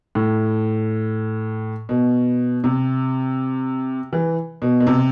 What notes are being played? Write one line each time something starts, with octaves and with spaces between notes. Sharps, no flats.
A2
B2
C3
E3
B2
B2
C3